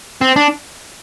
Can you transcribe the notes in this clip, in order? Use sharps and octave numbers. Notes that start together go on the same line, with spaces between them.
C4
D4